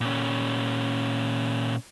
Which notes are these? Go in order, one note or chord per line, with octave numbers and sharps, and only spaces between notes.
A#2 C#4